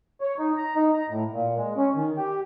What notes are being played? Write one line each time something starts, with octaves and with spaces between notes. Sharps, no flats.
C#5
D#4
A#5
D#4
A#5
A2
A#2
G#3
C#4
D#3
G4